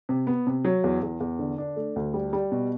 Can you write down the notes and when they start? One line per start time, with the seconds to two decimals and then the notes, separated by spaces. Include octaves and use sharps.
0.09 C3
0.27 B3
0.47 C3
0.65 F#3
0.84 E2
1.03 E2
1.20 E2
1.39 D3
1.58 D4
1.76 A3
1.96 D2
2.14 G3
2.33 G3
2.51 B2